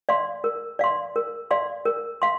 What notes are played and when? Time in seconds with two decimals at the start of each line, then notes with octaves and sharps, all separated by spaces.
0.09 D5 F5 C6
0.44 A#4
0.79 D5 F5 C6
1.16 A#4
1.51 D5 F5 C6
1.85 A#4
2.22 F5 C6